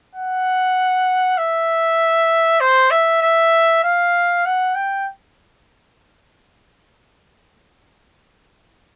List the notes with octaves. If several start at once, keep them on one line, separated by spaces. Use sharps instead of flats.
F#5
E5
C5
E5
E5
F5
F#5
G5